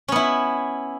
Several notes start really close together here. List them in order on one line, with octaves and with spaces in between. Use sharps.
C#4 B3 E4